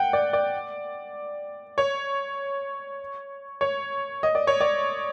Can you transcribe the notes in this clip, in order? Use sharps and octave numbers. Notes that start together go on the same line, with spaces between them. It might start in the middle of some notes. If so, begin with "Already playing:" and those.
Already playing: F#5 G5
D5
D5
C#5
C#5
D#5
D5
C#5
D5